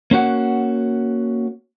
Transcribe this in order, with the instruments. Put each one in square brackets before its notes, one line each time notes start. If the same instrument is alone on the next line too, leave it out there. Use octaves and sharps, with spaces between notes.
[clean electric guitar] A#3 C#4 F#4 F#5